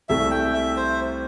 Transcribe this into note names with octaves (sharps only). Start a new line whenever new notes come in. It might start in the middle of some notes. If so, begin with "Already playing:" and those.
C2 C3 A3 E5
G5
E5
C5